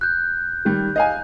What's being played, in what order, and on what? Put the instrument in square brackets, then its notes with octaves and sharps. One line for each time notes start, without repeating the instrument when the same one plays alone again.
[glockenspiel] F#6 G6
[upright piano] D#3 G3
D#5 F5 G#5